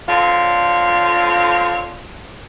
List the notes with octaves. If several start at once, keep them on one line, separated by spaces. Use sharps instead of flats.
D3 C4 F4 C#5